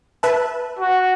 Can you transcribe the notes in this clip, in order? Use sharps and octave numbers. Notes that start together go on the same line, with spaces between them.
B4 E5 A5
F#4